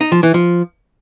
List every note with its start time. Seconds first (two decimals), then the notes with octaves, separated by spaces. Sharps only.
0.01 D#4
0.12 F3
0.23 E3
0.34 F3